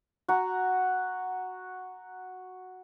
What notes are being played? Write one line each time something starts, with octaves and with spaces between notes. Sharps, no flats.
F#4 A#5